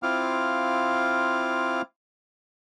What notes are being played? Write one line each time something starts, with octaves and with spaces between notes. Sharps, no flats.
C4 E4 F4 F5 D6 F6